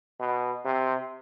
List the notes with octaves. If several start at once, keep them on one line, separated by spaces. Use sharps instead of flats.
B2
C3